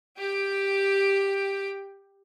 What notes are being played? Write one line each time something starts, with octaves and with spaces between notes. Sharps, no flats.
G4 G5